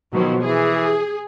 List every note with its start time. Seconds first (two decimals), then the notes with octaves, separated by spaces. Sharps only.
0.13 B2 D#3 F3 F#3
0.44 E3 G#4